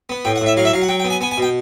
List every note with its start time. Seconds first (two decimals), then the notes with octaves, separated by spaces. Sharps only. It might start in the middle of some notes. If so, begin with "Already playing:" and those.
0.09 B3
0.25 A2 G5
0.36 F#5
0.41 A2 E5
0.57 F#3 F5
0.65 E5
0.73 F#3 F5
0.82 F#5
0.88 F#3 G5
1.00 G5
1.05 B3
1.10 G#5
1.21 B3 G#5
1.31 G#5
1.38 B2 G5